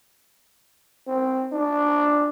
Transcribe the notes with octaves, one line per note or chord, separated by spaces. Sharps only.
C4
D4